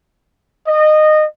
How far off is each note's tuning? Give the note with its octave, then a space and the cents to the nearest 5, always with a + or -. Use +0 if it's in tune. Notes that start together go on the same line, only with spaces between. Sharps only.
D#5 -20